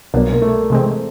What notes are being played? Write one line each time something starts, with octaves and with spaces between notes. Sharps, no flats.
C2 B2 F#3 A#3 B3 D4
A#3
A3
C3 E3 G#3 C4